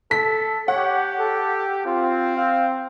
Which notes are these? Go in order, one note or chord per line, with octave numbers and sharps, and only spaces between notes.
A4 B6
G4 C#5 F#5
A4
C4 F4
F5